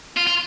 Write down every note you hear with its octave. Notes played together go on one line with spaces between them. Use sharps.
F4
F4